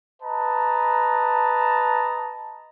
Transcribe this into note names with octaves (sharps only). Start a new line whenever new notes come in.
B4 D#5 A5 A#5